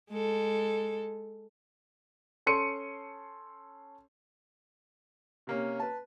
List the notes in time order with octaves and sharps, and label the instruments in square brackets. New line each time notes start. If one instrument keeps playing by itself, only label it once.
[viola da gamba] G#3 A4
[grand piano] C#4 A4 C6 C#7 D#7
[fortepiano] C3 A#3 C#4
B4 A5